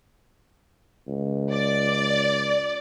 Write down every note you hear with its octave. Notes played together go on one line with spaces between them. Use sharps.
C#2
D5